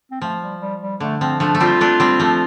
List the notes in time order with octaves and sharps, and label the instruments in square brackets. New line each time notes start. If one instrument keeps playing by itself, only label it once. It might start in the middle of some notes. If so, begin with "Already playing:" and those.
[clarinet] C4
[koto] F3 [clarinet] A3
[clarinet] G3
G3
G3
[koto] D3 [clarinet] A3
[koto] F3 [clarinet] C4
[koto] F3 A3 [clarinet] D4
[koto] A3
[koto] G3 C4 [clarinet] F4
[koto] A3 D4
G3 C4
F3 A3